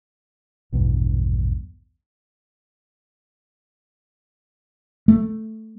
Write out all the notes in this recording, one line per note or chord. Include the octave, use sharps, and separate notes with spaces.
A#1 E2 G2 B2
A3